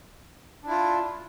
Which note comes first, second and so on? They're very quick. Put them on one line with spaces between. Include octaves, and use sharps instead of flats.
D4 E4 F4